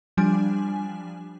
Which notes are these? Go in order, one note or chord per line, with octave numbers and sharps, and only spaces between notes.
F3 G3 D4 G#5